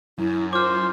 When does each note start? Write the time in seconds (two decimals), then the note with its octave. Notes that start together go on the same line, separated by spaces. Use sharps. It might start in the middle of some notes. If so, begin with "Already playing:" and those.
0.18 F#2 E4
0.53 F4 C5 D6 F6